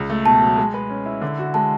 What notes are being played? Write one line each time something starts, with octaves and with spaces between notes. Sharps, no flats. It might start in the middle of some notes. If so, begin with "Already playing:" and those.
Already playing: C#2
A3
B2 A5
F#3
G#3
B4
C#4
E4
D3
F#4
G#3 A5